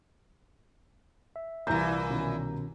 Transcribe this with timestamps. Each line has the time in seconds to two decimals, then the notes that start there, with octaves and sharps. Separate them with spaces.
1.36 E5
1.67 C2 A#2 E3 A#5 G6
2.10 B2 D#3 C#4